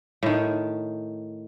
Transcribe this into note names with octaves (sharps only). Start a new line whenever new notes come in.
A2 D#3